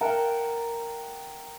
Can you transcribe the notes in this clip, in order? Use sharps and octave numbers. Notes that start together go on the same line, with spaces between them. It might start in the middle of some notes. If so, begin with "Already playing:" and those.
A#4 F#5 G5 A5